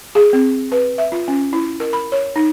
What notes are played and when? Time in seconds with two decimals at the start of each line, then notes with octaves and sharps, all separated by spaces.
0.15 G#4
0.33 C4
0.72 B4
0.98 E5
1.12 F4
1.28 C#4
1.53 E4
1.80 A#4
1.93 B5
2.12 C#5
2.36 D#4